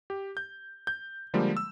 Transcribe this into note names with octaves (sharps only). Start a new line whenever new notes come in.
G4
G6
G6
D3 F3 G3 G#3 A#3
E6